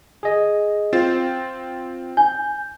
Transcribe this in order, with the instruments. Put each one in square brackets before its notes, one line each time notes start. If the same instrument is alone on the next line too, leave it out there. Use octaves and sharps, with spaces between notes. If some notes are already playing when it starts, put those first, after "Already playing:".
[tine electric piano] G#4 D#5
[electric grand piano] C4 F4 C5 [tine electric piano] A6
[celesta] G#5 [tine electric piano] G6